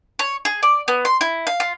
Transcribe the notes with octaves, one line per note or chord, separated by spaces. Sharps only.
C#5
G#4
D5
B3
C6
E4
F5
F4